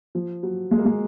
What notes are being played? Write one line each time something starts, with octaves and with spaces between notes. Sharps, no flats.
F3
F#3
G#3
A#3
G#3